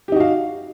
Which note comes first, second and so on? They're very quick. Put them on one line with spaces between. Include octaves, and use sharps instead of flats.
G4 D#4 F#4 F5